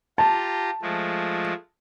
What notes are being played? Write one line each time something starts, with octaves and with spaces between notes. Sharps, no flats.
F4 G4 A5 A#5
F3 G#3 A3